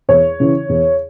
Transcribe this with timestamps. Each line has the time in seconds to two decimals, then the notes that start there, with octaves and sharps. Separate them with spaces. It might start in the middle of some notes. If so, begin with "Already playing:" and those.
0.08 E2 C#5
0.40 C#3 E3
0.69 E2